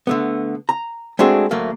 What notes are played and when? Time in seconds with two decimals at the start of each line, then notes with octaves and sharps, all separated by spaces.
0.07 D3 A3 B3
0.69 A#5
1.19 G#3 A3 C4 D4 F#4 G#4
1.51 D2 F#3 A3 A#3